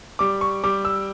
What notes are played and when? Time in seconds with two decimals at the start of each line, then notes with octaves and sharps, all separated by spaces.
0.19 G3 D6
0.41 C#6
0.64 G3 D6
0.85 E6